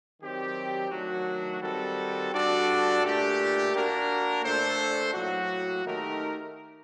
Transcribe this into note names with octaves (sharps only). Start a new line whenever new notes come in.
D#3 F#3 C4 G4 D5
D#3 F#3 A3 D4 F#4
D#3 G3 C4 F#4 A4
G3 D4 F#4 A4 D5
A#2 A3 D4 G4
A#3 D4 F#4 A#4
A#2 A3 D4 A4 C5
A2 F#3 A#3 F#4
D#3 A3 D#4 G4 A#4